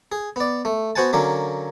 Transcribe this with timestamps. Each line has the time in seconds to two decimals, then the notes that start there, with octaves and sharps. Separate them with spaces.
0.12 G#4
0.36 B3 D5
0.65 A3
0.96 B3 F#4 C5 F#5 G#5 A5
1.13 D3 F#3 A#3 C#4